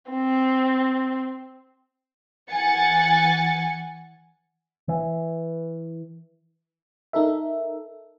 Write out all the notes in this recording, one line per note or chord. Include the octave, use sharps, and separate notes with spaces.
C4
E3 F#5 G#5 A6 C#7
E3
D#4 A4 A#4 E5